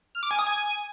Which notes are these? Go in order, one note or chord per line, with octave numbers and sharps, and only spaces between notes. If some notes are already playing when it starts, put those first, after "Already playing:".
F6
D6
G#5
D#6
G#5